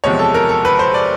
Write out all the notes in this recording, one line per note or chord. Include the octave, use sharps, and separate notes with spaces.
E2 C3 F3 G#3 C#5
A4
A#4
A4
B4
C5
D5